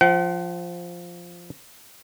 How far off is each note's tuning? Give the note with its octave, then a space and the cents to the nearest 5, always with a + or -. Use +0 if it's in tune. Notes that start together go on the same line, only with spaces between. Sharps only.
F3 +0 F#5 +45